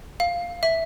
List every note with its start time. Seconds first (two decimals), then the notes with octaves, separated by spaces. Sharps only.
0.20 F5
0.63 E5